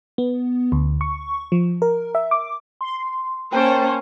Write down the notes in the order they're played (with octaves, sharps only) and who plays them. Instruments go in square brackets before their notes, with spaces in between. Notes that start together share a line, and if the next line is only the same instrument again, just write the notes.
[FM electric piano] B3
D2
C#6
F3
A#4
E5
D6
[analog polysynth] C6
[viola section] A#3 C#4 C5 [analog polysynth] G5 A5 C#6